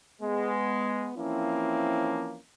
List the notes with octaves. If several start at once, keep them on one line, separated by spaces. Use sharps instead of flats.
G#3 B3
E3 F3 A#3 C4 C#4 E4